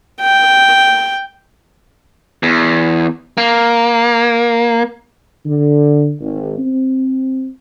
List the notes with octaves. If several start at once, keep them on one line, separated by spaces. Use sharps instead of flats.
G5
E2
A#3
D3
G#1
C4